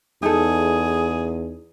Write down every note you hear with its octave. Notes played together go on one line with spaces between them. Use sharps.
E2 D#4 G#4 A4